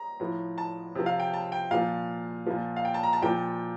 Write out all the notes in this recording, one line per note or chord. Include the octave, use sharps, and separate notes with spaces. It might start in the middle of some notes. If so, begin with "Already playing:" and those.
Already playing: A#5
A2 F3
A5
C3 F3
F5
G5
A5
G5
A#2 F3 F5
A#2 F3
F5
G5
A5
A#5
A5
A#2 F3 G5